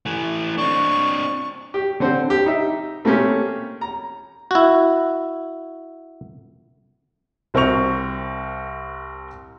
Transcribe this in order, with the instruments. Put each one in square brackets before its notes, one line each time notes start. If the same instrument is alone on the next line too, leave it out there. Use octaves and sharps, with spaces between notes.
[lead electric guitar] E3 A3
[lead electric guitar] C4 D4 [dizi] C#6
[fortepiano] G4
D3 C4 C5
G4
D#4 E5
A3 A#3 C4 C#4 G4
A#5
[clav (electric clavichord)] E4 F#4
[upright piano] C2 C4 A#4 C5 C#6 F7